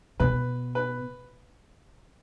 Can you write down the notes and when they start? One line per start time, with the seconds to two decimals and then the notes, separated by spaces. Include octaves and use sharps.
0.20 B2 B4
0.75 B4